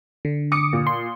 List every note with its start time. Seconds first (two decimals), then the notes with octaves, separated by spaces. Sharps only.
0.25 D3
0.52 D6 D#6 C#7
0.73 A#2
0.87 C6